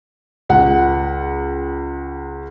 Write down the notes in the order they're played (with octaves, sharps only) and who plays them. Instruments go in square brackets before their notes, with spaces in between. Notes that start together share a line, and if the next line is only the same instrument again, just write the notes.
[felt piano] C#2 F#5